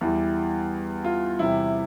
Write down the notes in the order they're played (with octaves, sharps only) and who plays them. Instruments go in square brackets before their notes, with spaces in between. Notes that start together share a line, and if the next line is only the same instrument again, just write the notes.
[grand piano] E2 E3 G3
F4
E2 C3 E3 G3 E4